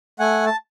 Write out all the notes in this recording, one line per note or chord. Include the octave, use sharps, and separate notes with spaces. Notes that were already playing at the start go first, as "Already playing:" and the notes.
A3 F#5 G#5
A5